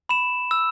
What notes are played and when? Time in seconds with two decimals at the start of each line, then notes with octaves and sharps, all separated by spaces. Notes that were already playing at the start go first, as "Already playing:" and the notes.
0.09 B5 E7
0.51 E6